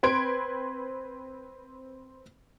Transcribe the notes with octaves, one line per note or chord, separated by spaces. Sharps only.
C4 B4 C6 G#6 D7